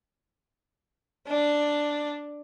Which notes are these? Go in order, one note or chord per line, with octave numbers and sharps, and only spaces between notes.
D4